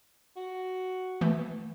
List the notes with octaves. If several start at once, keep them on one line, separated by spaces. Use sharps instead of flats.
F#4
E3 A3